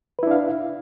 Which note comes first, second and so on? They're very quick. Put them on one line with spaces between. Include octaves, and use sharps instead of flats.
B4 E4 D4 F5